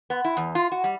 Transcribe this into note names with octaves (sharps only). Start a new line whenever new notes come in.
B3
E4
E2
F4
F#4
G3